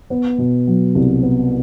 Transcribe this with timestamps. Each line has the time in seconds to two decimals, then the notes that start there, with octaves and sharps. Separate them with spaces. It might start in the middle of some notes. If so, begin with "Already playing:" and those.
0.10 B3
0.38 B2
0.67 F#3
0.95 C2
1.22 B3